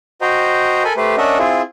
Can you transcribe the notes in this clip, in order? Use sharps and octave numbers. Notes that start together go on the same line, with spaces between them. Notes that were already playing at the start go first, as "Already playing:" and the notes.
F#4 C5 D#5 G5 A#5
A4 A#4 G#5 B5
A3 G4 B4 C5
C#4 D4 A#4 D#5 E5 F#5
C4 E4 F4 G#4